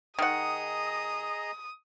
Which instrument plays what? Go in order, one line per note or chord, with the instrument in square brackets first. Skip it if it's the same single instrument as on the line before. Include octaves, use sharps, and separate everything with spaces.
[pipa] D#3 F#5 [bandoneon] G#4 D#5 A#5 [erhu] D#6